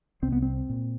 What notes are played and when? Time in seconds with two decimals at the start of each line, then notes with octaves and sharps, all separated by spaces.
0.22 C2 C4
0.32 B3
0.42 C4
0.69 A#2